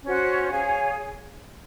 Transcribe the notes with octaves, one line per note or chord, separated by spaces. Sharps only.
C#4 F#4 C5 F#5
G#4 C#5 F5 G#5